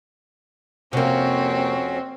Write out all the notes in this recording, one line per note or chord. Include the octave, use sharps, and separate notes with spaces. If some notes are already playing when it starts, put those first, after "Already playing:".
F2 C3 A#3 C4 C#4 F#4